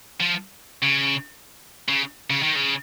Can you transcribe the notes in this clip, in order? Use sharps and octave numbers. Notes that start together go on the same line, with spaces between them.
F3
C#3
C#3
C#3
D#3
C#3